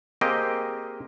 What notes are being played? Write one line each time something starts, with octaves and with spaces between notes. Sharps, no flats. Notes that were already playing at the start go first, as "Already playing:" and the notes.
A#3 C4 G4 G#4 D#5 G5